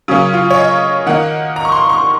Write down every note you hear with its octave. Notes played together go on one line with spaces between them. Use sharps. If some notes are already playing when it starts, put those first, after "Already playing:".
C#3 F#3 A#3 C#4
F4
C#5
D#5
D#3 A#3 D#4 F#5
A#5
C#6
C6
C#6